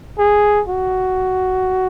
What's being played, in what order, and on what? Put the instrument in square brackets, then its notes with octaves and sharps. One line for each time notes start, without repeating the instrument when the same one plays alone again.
[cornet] G#4
F#4